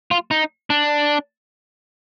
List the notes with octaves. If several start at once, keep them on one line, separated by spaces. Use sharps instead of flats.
F4
D#4
D4